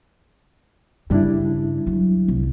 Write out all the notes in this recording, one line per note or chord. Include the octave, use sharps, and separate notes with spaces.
G2 C#3 G3 D4 E4
F#3
C2